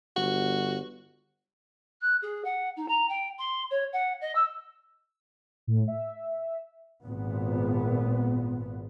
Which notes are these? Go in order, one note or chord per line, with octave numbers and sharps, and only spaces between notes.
G1 F#4
F#6
G#4
F#5
D#4
A#5
G5
C6
C#5
F#5
D#5
E6
A2
E5
G#1 A#2 B3